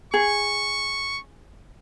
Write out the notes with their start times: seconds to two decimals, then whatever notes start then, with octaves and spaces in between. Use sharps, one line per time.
0.14 G#4 C#6